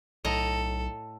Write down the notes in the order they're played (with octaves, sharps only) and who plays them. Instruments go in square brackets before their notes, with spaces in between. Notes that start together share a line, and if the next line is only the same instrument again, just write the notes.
[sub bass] B1 [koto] A2 D#5 A#5 [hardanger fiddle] A4